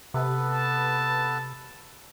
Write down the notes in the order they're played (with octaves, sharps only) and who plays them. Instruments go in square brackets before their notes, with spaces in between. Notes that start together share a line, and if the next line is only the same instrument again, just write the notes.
[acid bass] C3 [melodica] B3 A4 B4
[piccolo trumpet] A5